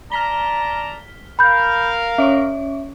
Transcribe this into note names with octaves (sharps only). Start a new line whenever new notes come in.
D5 A5 A#5 F6 B6 G7
A#4 F5 B5 G6
C#4 C#5 E5 C#6